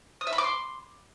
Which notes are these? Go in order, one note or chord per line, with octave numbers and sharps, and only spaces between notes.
D#6
E5
B5
D6
C6